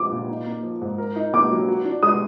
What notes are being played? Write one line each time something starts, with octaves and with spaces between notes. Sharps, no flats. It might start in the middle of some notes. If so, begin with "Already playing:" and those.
Already playing: F3 D6
A#2
D#4
A#3
F3
G#2
A#4
D#4
A#3 D6
F#3
F#4
D4
G#3 D#6